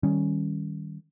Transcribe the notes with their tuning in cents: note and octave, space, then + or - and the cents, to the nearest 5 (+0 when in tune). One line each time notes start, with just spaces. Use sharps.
D#3 +0 G3 +0 C#4 +0